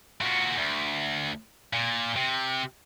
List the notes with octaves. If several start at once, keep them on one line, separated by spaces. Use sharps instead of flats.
A#2 F#4
D2
A#2
C3